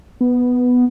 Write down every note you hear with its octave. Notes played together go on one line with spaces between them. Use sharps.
B3